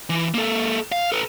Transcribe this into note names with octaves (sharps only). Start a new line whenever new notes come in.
E3
A#3 A4
F5
A4 B4